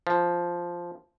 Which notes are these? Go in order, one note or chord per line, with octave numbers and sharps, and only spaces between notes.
F3